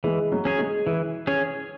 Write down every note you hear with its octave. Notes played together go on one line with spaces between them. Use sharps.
E3 G#3
F#3
C#4 G#4 C#5
G#3
E3
C#4 G#4 C#5